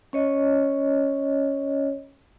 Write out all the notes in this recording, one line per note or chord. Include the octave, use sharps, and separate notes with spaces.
C#4 C#5 D#5